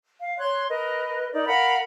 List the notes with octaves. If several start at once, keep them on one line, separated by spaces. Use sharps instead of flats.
F5
C#5 C6 F#6
A#4 B4 D#5
D#4 A#4 D5
A#4 F5 F#5 B5